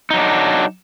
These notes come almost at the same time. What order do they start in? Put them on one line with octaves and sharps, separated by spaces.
D#4 F#3 D4